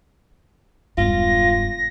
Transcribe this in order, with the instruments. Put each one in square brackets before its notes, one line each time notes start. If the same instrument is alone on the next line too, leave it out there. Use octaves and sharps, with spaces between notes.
[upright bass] E1 G2 [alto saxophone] F4 [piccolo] A#6